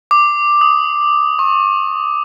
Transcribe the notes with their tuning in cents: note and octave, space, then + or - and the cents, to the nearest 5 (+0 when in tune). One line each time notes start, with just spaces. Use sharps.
D6 +10
D#6 +5
C#6 -45